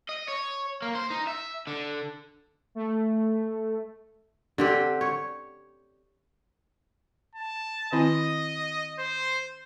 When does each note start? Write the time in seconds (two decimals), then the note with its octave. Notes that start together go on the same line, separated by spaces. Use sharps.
0.09 D#5
0.28 C#5
0.82 A#3
0.95 C5
1.10 D#4
1.27 E5
1.67 D3
2.75 A3
4.58 D3 C4 G4
5.01 C#5
7.35 A5
7.92 D#3 C4 E4 D#5
8.99 C5